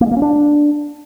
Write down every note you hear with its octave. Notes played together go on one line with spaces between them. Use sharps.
A#3
G#3
A#3
C#4
D4